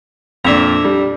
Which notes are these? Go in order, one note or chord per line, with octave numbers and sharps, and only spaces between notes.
F2 A#2 D4 E5 A#5
G3